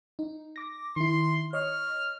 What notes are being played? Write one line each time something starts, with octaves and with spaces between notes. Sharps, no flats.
D#4
D6 A#6
D#3 E4 C6
C#5 D#5 C#6 F6